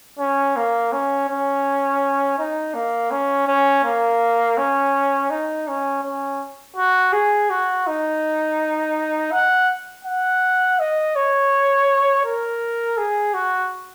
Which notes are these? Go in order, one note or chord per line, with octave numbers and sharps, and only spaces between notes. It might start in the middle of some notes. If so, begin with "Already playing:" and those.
C#4
A#3
C#4
C#4
D#4
A#3
C#4
C#4
A#3
C#4
D#4
C#4
C#4
F#4
G#4
F#4
D#4
F#5
F#5
D#5
C#5
A#4
G#4
F#4